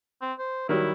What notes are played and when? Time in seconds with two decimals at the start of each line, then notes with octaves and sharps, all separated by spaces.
0.21 C4
0.39 C5
0.69 D#3 F#3 G3 E4